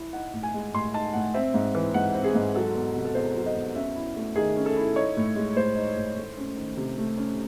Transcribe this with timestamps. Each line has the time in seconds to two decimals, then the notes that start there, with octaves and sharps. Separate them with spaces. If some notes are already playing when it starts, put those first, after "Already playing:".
Already playing: E4
0.13 D#4 F#5
0.33 A2
0.43 G#5
0.54 G#3
0.73 A2 C6
0.94 D#4 A5
1.14 A2 F#5
1.34 C4 E5
1.54 G#2
1.75 E3
1.94 G#2 F#5
2.15 C4
2.24 G#4
2.35 G#2
2.55 F#3 A4
2.74 E2
2.96 C3
3.05 A4
3.15 E2 C5
3.35 F#3
3.46 D#5
3.55 E2
3.75 C#4 E5
3.95 E4
4.16 A3
4.36 D#3 G#4
4.57 C#4
4.66 A4
4.77 E4
4.96 D#4 C#5
5.17 A2
5.36 G#3
5.56 A2 C5
5.76 D#4
5.97 A2
6.16 A3
6.37 C#4
6.57 D#3
6.77 C3
6.98 A3
7.17 C#4